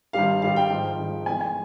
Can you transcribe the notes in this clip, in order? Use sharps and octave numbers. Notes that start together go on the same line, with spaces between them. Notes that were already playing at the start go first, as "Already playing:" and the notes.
G#1 G2 G3 F5
G#1 G2 G3 F5
G5
G#1 G#2 F3
G#1 G#2 F3
F1 E2 E3 G#3 G#5
G#5